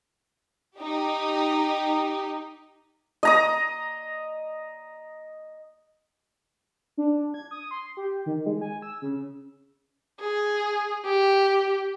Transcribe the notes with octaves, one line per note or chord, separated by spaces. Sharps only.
D#4 G4
D#5 A#5 D#6
D4
G#6
D#6
C6
G4
D#3
G#3
G#5
E6
C#3
G#4
G4